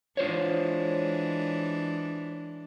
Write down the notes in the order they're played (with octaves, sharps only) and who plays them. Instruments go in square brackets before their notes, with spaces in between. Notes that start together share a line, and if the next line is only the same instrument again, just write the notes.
[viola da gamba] E3 G#3 D4 [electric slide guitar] F4 C5 C#5